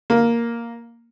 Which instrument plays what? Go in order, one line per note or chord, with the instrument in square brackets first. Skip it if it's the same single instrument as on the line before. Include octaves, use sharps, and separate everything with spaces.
[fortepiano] A#3